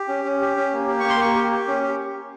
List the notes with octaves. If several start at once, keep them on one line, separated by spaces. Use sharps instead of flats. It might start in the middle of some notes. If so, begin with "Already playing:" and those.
Already playing: G4
C#4
C#4
G4
C#4
A#3
G4
A#3 C#6
C6
A#3 C#6
G4
G4
C#4
G4